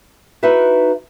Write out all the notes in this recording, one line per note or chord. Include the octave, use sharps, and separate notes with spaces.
D#4 E4 F#4 B4 E5